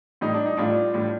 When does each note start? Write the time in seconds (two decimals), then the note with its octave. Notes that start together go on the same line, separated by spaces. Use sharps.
0.21 A2 G3 D#4
0.34 D4
0.46 D#4
0.57 A2 G3 D4 F4
0.94 A2 G3